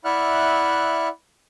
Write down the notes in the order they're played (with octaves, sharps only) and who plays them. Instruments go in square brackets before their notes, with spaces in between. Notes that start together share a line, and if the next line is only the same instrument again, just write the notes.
[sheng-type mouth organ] E4 D5 E5 F#5 F6 F#6